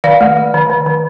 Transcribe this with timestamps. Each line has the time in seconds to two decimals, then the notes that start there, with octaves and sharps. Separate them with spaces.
0.04 D#3 D5 F5
0.21 A3
0.37 A3
0.54 D#3
0.70 D#3
0.86 D#3